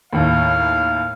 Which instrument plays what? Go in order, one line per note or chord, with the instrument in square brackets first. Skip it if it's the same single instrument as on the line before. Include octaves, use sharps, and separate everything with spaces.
[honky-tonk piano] D#2 A2 [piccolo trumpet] F5